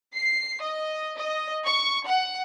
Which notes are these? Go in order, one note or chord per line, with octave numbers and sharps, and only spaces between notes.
C7
D#5
D#5
C#6
F#5